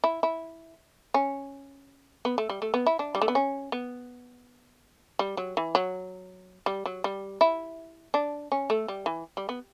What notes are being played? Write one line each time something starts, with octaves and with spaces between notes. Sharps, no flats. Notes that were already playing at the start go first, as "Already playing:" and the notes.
E4
E4
C#4
B3
A3
G3
A3
B3
E4
D4
G3
A3
B3
C#4
B3
G3
F#3
E3
F#3
G3
F#3
G3
E4
D4
C#4
A3
G3
E3
G3
B3